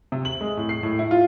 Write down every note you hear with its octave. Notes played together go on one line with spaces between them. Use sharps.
C3
F#7
G#3
A2
C7
A2
E4
F4